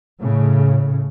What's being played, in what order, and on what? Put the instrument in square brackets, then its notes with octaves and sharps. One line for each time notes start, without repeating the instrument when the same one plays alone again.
[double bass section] A2 C#3